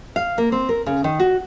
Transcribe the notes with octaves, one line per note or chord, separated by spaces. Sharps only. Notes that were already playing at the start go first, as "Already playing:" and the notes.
F5
A#3
C4
A#4
C#3
D#3
F#4